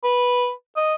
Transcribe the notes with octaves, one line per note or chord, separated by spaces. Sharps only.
B4
D#5